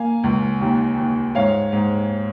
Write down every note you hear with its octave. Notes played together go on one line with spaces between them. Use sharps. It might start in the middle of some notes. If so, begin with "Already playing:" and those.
Already playing: A#3 F5 G#5
C#2
D#2
D#2
G#2 C#5 F5
G#2